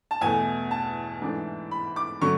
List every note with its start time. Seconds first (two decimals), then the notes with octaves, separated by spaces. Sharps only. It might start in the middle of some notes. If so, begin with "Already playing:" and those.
0.11 A5
0.21 E2 B2 A3 G#5
0.71 A5
1.21 G#2 E3 A3 D4
1.71 B5
1.96 D6
2.21 D3 F#3 A3 C#6